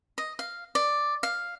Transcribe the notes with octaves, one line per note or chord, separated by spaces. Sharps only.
D#5
F5
D5
F5